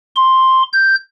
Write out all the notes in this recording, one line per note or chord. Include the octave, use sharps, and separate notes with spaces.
C6
G6